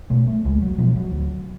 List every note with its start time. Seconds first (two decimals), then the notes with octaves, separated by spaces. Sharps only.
0.10 B2 A3
0.28 A3
0.45 C#2 G#3
0.62 F#3
0.78 B2 F3
0.96 F#3
1.12 D2